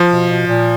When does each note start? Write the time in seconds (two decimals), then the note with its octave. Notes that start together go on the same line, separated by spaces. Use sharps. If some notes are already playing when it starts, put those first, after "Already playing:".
Already playing: F3
0.11 B2
0.29 B2
0.47 A#2